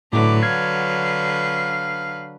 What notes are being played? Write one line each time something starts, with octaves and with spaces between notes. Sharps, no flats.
A2 D3 F#3 A3 B4 D6
F5 G#6